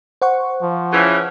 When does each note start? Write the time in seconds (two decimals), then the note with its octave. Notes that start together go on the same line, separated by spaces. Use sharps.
0.22 C5 F#5 C#6
0.62 F3
0.93 C#3 E3